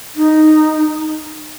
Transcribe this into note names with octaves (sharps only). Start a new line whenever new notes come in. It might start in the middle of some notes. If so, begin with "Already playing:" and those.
D#4